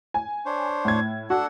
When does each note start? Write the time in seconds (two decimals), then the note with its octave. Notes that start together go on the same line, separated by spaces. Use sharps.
0.14 G#5
0.46 D4 C5 C#5
0.85 A2 G#6
1.30 D4 F#4 A4 F#5